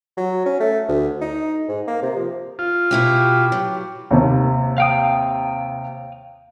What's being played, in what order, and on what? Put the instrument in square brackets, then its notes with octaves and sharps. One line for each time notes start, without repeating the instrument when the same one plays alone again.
[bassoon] F#3
C#4
A3
D2
D#4
G#2
A#3
C3
F3
[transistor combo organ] F4
[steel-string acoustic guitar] B2 E4 F#4 [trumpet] G4
[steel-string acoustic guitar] F#3
[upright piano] D#2 C3
[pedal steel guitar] F5 G5 D#6